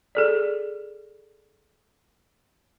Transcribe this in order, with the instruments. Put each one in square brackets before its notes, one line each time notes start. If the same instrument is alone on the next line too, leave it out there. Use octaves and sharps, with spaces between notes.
[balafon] G#4 A4 D5